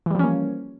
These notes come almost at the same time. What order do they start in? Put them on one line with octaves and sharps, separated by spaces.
E3 G3 F3 C#4 A#3